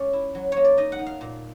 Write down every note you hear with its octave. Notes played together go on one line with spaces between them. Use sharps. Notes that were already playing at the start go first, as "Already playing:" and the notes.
Already playing: G#3 C#4 D5
E4
F#3
A#3 C#5
D5
D#4 D#5
F#5
D#4
F5
A#2